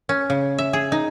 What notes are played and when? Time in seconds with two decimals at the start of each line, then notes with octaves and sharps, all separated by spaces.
0.09 C#4
0.30 C#3
0.58 E5
0.73 G#4
0.92 D#4